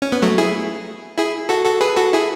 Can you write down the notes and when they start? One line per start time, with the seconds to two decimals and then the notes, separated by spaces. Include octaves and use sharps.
0.02 C#4
0.12 B3
0.22 F#3 A3
0.38 E4 G#4
1.18 E4 G#4
1.49 F#4 A4
1.65 F#4 A4
1.81 G#4 B4
1.96 F#4 A4
2.13 E4 G#4